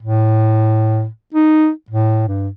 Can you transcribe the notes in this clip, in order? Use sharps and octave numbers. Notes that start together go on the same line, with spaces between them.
A2
D#4
A2
G2